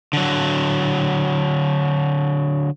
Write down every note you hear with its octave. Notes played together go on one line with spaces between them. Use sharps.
D3 F#3